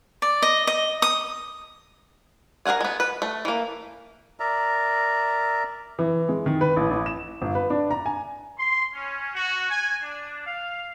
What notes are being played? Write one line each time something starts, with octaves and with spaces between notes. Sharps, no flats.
D5
D#5
D#5
D#6
G#4 A#4 F5 F#5 G#5
G#3 B3
B4
A3
E3 A#3
A#4 D5 E5 A#5
E3
G#3
D#3
B4
A1
A1
E7
G1
B4
D4
A#5
G#5
C6
C#4
F#4
G#5
D4
F5